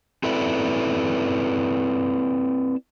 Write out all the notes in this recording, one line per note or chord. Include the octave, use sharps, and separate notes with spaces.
C4 E4 A4 B4 D5 E5